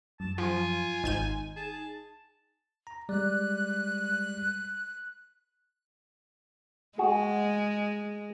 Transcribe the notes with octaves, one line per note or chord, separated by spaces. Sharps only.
F#2 A5
F3 F4 G#5
G#1 D#4 G6 D#7
G#4 A5
A#5
G3 G#3 D5 F#6
G#3 F#4 G#4